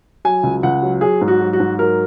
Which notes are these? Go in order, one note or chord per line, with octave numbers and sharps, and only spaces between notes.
F#3 G#5
C#2
C#2 F#5
F#3
F#3 G#4
G#2
F#4
F#3
F#4
G#2
F#3 A#4